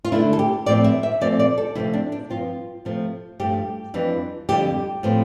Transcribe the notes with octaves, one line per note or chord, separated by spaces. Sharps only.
F4
D3 A3 D4 E4
A4
G4
A2 F3 C4 D5
E5
E5
A#2 F3 A3 C4 D5
D5
A4
C3 F3 A3 C4 E4
D4
D4
G2 F3 C4 F4
C3 F3 A3
G2 F3 A3 G4
F2 E3 G3 D4
F2 D3 G3 G4
A2 F3 A3 C4